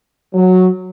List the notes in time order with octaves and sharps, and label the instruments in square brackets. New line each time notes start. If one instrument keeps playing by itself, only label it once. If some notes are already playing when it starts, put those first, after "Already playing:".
[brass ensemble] F#3